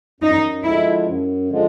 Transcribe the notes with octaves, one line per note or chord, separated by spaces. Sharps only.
F#2 D#4
D3 F3 G#3 E4
F#2
D3 F3 G#3